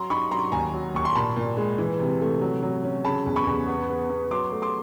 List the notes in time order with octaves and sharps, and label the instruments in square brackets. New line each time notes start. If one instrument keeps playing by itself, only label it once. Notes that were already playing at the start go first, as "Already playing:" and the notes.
Already playing: [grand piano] F#3 A#5 C6
D#4 B5 C#6
F#3 A#5 C6
D#2 G#5 A#5
F#3
D#2 C#6
C6
A#2 A5 B5
A#2
G#3
E3
C3
A3
F#3
F#3
C#4
C#3 A5 B5
E2
B5 C#6
E2
B3
B3
B3
F#3 C6 D6
A3
C6 D6